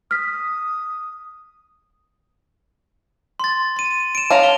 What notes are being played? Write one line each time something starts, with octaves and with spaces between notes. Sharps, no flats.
D#6 F6 B6
C6 A6
C6 D#7
D7 E7
C#4 F5 A5 A#5 F7
G7